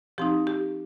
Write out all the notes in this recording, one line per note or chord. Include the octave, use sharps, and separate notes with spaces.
F3 C4 D#4 G4
G4